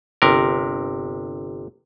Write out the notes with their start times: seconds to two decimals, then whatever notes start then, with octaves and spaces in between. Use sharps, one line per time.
0.22 G1 C3 A#4